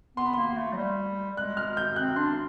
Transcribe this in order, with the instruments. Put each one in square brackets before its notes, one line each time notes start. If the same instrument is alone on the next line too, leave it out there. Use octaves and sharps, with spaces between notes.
[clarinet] B3 [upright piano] C6
[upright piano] B5
[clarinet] A#3 [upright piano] C6
[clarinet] A3
F#3
G3
[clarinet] G#3 [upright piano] F#6
[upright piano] F6
G6
[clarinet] C4 [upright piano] F#6
[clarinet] D4 [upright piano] C6